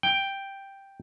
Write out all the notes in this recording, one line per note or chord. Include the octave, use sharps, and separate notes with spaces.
G5